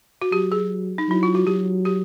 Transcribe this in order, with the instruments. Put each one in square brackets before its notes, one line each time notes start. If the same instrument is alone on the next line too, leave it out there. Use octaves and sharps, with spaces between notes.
[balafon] F#4
[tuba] F#3 [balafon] G4
[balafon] G#4
D#4
[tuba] F#3 [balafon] E4
[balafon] F4
F#4
[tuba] F#3 [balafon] G4
[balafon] G4